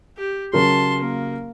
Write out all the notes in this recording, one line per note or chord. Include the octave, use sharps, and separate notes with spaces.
G4
C#3 F#3 A#4 A5 C6
A#3